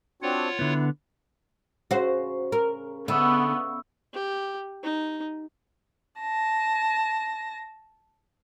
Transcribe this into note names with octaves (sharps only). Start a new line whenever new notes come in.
C4 D4 F4 F#4 C#5 F#5
D3 B3 E4
C#3 F#4 C5
A#4
D3 B3 E5 B5 C#6
G4
D#4
A5 A#6